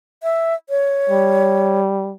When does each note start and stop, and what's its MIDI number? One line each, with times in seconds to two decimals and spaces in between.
0.23 0.54 76
0.70 1.79 73
1.10 2.14 55